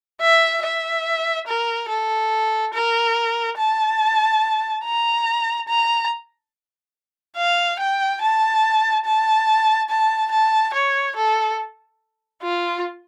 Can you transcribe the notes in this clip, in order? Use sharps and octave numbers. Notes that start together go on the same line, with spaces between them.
E5
E5
A#4
A4
A#4
A5
A#5
A#5
F5
G5
A5
A5
A5
A5
C#5
A4
F4